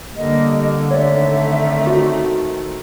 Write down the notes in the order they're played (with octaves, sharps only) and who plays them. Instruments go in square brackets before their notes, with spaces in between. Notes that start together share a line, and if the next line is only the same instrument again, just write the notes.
[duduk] D3 [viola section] G3 A#3 [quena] D#5
[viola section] D#3 A3 C4 [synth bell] C#5 D5 [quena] E5
[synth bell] F#4